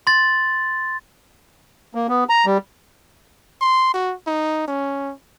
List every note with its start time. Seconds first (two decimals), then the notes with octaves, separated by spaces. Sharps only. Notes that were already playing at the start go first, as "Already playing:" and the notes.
0.07 C6 A6
1.95 A#3
2.09 B3
2.29 A#5
2.46 G3
3.61 C6
3.93 F#4
4.27 D#4
4.67 C#4